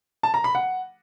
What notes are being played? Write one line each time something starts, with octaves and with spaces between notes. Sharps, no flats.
A5
A#5
B5
F#5